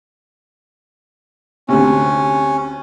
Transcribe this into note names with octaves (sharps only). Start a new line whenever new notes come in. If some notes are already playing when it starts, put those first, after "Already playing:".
D2 C3 C#4